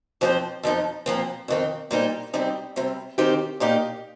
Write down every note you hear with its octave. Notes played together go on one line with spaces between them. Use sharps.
F2 F3 C4 G4 C5
F2 F3 D#4
A#2 F3 C4
F2 D#3 C4
A#2 G3 D#4 C5
C3 G3 C4 D#4 G4
C3 G3 C4
D#3 C4 D#4 G4 C5
A#2 A#3 D#4 G4